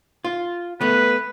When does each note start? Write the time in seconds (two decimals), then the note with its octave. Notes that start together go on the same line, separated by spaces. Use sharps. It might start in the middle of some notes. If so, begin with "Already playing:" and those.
0.25 F4
0.81 A3 B3 B4